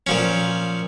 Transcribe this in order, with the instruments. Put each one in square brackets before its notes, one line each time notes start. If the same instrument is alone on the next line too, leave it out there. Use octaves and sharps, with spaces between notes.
[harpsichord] A#2 F3 C#4